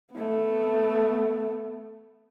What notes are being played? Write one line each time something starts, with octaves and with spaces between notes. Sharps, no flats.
A3 B3